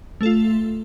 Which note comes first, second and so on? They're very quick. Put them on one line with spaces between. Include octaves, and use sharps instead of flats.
A3 A4 F4